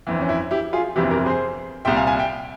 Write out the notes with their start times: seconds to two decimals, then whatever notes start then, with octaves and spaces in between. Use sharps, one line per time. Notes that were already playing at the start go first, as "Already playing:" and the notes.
0.07 G1 F2 E3
0.21 C#4
0.29 E4
0.51 E4 G4
0.73 F4 G#4
0.96 G1 F2 C3 E3 E4 G4
1.10 G4 A#4
1.26 G#4 C5
1.85 C2 A#2 E5 G5
1.97 F5 G#5
2.07 F5 G#5
2.18 E5 G5